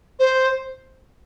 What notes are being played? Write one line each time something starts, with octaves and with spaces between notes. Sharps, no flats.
C5